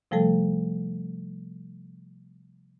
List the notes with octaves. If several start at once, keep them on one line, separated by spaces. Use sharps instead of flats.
C3 F3 G3 A3 A4